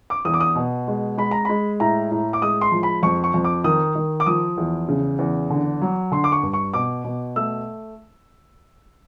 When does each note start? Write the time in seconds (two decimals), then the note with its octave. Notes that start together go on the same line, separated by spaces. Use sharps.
0.10 D6
0.25 E2 D#6
0.34 D6
0.40 D#6
0.56 B2
0.88 G#3
1.18 G#3 B5
1.31 A#5
1.45 G#3 B5
1.80 A2 A#5
2.11 A2
2.33 D6
2.42 G#3 D#6
2.61 C6
2.72 F3
2.83 B5
3.03 F2 C#6
3.24 C#6
3.34 F2
3.44 D6
3.64 D#3 D#6
3.95 D#3
4.20 D6
4.26 F3 D#6
4.58 E2
4.89 C#3
5.19 E2
5.50 D3
5.82 F#3
6.12 D3 C6
6.24 D6
6.32 C#6
6.43 G2
6.53 C#6
6.74 B2 D6
7.04 B2
7.36 A3 E6